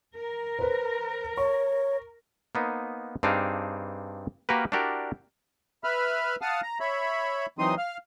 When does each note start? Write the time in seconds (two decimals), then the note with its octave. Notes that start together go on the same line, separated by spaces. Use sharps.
0.15 A#4
0.59 B4 C5
1.37 C#5 C#6
2.55 A#3 B3 D#4 C5
3.23 G2 C4 D4 D#4 G#4 F5
4.49 A#3 F#4 G4 A#4 B4
4.72 D4 E4 F#4 G4 A#4 D5
5.84 B4 E5 B5 F6
6.41 F5 F#5 A5 D#6 F6
6.63 A#5
6.80 C#5 E5 B5
7.59 E3 F#3 C4 D#4 C6 D#6
7.78 F5 F6